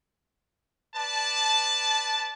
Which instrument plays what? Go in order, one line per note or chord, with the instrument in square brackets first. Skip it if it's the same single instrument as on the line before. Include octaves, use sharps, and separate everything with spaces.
[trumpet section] B4 D5 A5